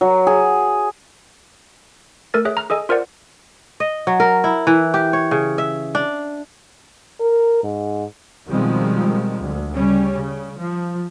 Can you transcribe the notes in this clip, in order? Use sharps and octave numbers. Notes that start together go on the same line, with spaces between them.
F#3
G#4
A3 A4 A#4 A6
G#4 C#5 E5 F#6
A#5 F6
G#4 A4 D#5 G#5
F4 A#4 C5 D5 F#5
D#5
F#3
A#4
E4
E3
G4
C#5
C#3
E5
D4
A#4
G#2
B2 D#3 F3 G3 G#3 C4
D2
C#3 G3 C#4
C#3
F3